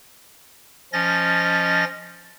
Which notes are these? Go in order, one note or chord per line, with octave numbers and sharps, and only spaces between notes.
F3 C#4 D#5 A6 A#6